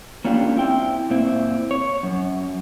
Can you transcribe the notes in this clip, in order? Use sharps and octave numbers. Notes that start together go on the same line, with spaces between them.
A#3 C#4 D4 F4 G4
C4 E4 G5
A#2 C4 E4
C#5
F#2